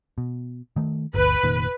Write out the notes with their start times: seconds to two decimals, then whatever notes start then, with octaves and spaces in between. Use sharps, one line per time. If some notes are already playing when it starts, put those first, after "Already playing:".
0.18 B2
0.76 D#3 A3
1.14 G1 D2 B4
1.44 F1 A#2 D#3